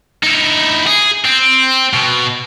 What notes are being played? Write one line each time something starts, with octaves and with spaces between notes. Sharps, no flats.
D#4 E4
G#4
C4
B2